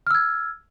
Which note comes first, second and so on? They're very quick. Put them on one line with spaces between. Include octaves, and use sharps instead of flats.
F6 E6 G#6